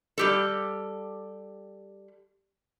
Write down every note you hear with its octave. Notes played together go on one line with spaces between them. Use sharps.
G3 G4 A4